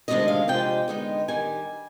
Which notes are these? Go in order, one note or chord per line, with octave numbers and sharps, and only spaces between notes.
D2 C3 D#3 G#3 D4 D#5
F5
C3 F3 G#3 D4 G5
D3 G#3 B3 D#4
D#3 G3 G#5